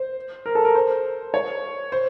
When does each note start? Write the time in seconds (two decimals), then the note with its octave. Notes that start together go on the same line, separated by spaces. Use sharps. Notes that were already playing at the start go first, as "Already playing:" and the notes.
Already playing: C5
0.46 A#4
0.55 A4
0.65 A#4
0.75 C5
1.34 C#5
1.92 C5